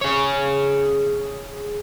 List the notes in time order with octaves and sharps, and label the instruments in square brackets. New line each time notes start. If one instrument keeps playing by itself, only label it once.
[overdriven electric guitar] G#4 C#5